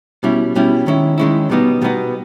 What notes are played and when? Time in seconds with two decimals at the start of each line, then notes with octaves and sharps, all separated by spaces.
0.23 B2 G3 C#4 E4
0.55 B2 G3 C#4 E4
0.87 D#3 G#3 C#4 E4
1.18 D#3 G#3 C#4 E4
1.50 B2 G3 B3 D#4
1.82 B2 G3 B3 D#4